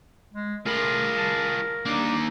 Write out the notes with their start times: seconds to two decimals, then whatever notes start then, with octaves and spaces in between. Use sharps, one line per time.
0.33 G#3
0.66 A3 F4 G#4 A#4 B5
1.17 A5
1.86 G3 A#3 D4 D#4